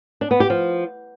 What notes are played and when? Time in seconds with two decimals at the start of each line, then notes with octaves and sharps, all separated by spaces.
0.21 D4
0.31 B3
0.40 G4
0.50 F3